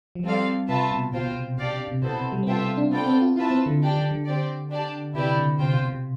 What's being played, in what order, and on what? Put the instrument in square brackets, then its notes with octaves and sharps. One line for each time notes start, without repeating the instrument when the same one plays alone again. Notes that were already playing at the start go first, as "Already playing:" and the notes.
[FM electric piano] F3
[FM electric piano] G3 [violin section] C4 F4 A4 D5 F5
[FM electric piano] C3 [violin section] F4 B4 E5 A5
[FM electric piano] B2
[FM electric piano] B2 [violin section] F4 C5 G5
[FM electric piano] B2
C3
[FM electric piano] B2 [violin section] D4 G4 D5 F5
[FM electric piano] C3
C3
[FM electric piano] B2 [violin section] B3 E4 A4 C5
[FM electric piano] C3
G3
C4
[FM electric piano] B3 [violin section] F4 A4 E5 G5
[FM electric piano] C4
D4
[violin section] B3 F4 A4 D5 G5 [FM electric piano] C4
[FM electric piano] C4
F4
[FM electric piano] E4 [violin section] F4 B4 E5 A5
[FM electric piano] C4
D3
[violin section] D4 G4 D5 G5
[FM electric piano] D3
D3
[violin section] C4 G4 D5
D4 G4 D5 A5
[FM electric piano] C3 [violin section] E4 G4 B4 D5 G5
[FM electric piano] D3
[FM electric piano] C3 [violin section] F4 C5 G5
[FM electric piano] B2
C3